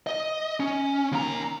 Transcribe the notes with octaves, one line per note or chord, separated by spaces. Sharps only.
D#5
C#4
D#2 A#5